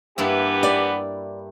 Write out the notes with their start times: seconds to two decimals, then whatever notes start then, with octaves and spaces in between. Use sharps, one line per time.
0.18 G2 E3 A#3 B3 E4 G4
0.63 D5